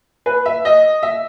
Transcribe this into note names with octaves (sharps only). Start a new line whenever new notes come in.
B4
E5
D#5
E5